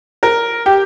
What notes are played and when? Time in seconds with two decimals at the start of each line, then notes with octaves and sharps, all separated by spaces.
0.23 A#4
0.66 G4